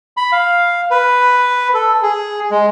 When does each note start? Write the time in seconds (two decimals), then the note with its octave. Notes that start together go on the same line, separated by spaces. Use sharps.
0.17 B5
0.32 F5
0.91 B4
1.74 A4
2.03 G#4
2.50 G#3